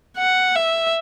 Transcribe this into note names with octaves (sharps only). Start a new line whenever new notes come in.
F#5
E5